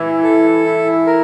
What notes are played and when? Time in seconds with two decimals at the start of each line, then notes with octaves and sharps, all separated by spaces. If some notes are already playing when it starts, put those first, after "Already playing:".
Already playing: E3 E4
0.24 A4
0.65 E4
1.07 A#4